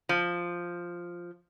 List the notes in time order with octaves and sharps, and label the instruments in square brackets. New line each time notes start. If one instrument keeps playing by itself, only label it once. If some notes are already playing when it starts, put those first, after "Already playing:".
[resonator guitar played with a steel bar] F3